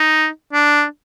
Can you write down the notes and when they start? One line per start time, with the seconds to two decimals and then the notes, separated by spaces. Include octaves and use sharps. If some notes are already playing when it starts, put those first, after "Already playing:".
Already playing: D#4
0.53 D4